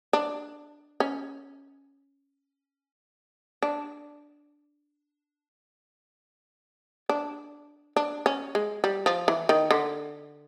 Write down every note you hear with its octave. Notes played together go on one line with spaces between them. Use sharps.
D4
C#4
D4
D4
D4
C#4
G#3
G3
F3
E3
D#3
D3